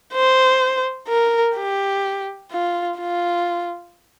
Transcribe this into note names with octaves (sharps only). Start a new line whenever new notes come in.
C5
A#4
G4
F4
F4